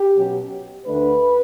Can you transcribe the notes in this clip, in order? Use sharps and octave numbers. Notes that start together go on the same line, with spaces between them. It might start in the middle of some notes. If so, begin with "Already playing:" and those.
Already playing: G4
B2 F#3 C#4
D2 D3 A3 D4 B4